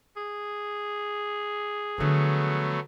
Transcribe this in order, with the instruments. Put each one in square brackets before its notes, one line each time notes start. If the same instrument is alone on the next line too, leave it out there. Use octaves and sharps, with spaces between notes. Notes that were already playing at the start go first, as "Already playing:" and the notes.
[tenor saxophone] G#4
[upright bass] D3 F3 [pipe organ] F#3 A3 B3